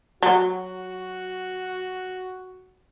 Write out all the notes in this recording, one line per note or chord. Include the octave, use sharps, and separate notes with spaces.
F#3 F#4